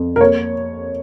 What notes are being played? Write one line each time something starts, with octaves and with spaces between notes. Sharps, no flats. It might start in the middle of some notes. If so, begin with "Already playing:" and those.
Already playing: F2
A#4
A#3 C#5